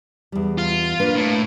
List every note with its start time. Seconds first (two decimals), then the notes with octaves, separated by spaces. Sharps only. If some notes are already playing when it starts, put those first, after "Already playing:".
0.32 E2 G3
0.58 F4
1.00 A#3 D4 B4
1.16 A2